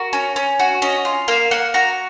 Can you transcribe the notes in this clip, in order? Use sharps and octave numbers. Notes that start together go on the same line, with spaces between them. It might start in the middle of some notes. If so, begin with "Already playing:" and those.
Already playing: F#4 A#4
C#4
C#4
F#4
C#4 D#5
F4
A#3 F5
A#3 F#5
F#4 A#5